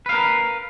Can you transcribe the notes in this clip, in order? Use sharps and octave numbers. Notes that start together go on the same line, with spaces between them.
A#4 B4 F5